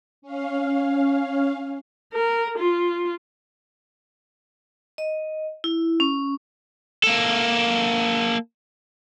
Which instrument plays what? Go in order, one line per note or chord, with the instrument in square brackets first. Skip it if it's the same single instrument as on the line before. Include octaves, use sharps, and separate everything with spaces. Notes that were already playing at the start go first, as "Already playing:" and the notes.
[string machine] C#4 F5
[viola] A#4
F4
[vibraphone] D#5
E4
C#4
[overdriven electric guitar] A#3 A4